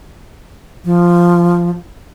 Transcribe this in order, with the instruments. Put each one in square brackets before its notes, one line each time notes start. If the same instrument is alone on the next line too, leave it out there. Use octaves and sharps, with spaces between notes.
[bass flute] F3